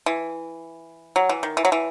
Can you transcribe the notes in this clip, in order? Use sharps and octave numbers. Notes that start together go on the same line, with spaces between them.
E3
F#3
E3
D#3
E3
F#3
E3